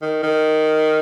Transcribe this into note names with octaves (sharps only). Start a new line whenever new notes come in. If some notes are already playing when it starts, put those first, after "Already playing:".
D#3
D#3